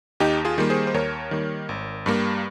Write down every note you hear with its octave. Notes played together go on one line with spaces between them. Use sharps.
D#2 D#4 G4
F4 G#4
D#3 G3 A#3
G#4 C5
C5
D#2 A#4 C#5
D#3 G3 A#3
G#1
G2 G3 A#3